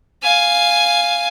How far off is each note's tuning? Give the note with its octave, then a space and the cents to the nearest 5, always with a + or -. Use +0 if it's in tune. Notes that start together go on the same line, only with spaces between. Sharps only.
F5 +0 G#5 +0